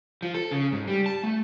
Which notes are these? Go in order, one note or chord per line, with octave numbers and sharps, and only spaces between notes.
F3
A4
C#3
G#2
G3
A5
A3